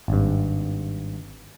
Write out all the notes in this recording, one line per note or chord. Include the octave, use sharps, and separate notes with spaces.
G#1 G2